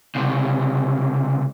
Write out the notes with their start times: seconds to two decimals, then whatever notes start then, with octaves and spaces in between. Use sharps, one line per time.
0.16 C#2 C3